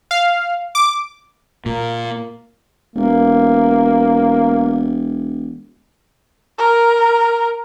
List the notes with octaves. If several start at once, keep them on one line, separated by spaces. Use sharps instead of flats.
F5
D6
A#2 A#3
E1 A#3
A#4